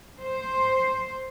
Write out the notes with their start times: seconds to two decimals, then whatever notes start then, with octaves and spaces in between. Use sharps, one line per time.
0.21 C5